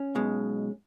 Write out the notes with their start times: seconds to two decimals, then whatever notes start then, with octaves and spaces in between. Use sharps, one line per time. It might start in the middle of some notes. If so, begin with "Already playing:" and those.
Already playing: C#4
0.15 B1 B2 G#3